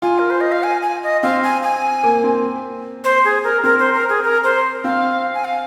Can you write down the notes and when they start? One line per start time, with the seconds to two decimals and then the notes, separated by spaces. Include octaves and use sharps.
0.02 F4 G#5
0.19 A#4
0.30 C5
0.41 D#5
0.52 F5
0.63 G#5
0.83 G#5
1.03 D#5
1.23 C4 F5
1.44 G#5
1.63 G#5
2.03 A#3
2.24 C4
3.04 C5
3.25 G#4
3.44 A#4
3.64 C4 A#4
3.79 C5
3.94 A#4
4.09 G#4
4.24 A#4
4.44 C5
4.84 C4 F5
5.35 G#5
5.45 F5